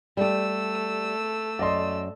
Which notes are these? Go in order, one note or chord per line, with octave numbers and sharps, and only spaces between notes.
G3 A3 G4 E6
F#2 D5 D#5 C6